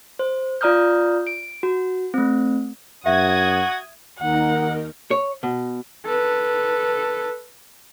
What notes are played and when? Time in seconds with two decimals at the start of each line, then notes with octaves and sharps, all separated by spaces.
0.19 C5
0.61 F4 D5 A#5 D#6 F6 G6
1.27 D7
1.63 F#4
2.14 A3 C4
3.06 F#2 F#4 E5 F#5 D#6 G#6
4.19 D#2 D#4 A#4 F#5
5.11 C#5
5.43 B2
6.06 A4 B4